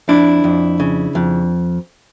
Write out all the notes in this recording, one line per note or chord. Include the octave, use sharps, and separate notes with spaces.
F2 D4 E4
F2
C#3
F2